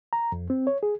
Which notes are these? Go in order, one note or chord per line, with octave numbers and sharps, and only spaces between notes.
A#5
F2
C4
C#5
G#4